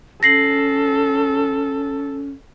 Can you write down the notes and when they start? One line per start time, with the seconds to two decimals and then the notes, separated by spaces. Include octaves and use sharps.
0.23 C#4 A4 A#6 C7 F#7